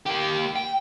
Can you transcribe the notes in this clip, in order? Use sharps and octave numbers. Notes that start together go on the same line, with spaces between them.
A#3 G4
G5